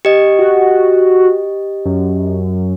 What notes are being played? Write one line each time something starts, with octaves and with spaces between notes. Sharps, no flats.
G4 D#5
F#4
F#2